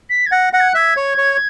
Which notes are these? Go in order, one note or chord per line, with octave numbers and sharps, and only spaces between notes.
B6
G#6
F#5 A#6
F#5 A#6
G#6
F#6
E5 G#6
C#5
C#5